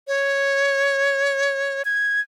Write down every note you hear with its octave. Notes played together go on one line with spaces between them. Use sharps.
C#5
G#6